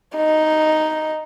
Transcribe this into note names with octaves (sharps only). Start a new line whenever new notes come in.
D#4